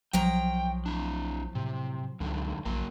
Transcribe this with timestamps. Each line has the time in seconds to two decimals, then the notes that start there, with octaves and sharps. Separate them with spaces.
0.13 B1 F3 F#3 G5 A#5
0.86 D4 E4
1.55 A2 C3
2.20 C#2 F#2 D3 D#3
2.65 A#1 F#2 A#3